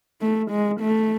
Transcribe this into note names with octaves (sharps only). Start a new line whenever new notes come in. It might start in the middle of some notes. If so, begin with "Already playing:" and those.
A3
G#3
A3